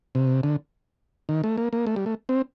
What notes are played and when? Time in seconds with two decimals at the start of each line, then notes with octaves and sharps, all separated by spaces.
0.15 C3
0.43 D3
1.29 D#3
1.44 A3
1.57 A#3
1.73 A#3
1.87 A3
1.96 G3
2.06 A3
2.29 C4